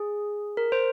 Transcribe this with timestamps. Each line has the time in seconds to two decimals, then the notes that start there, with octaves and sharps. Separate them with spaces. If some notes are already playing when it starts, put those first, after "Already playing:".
Already playing: G#4
0.57 A#4
0.72 C5